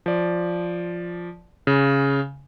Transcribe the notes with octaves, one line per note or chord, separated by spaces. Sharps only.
F3 D5
C#3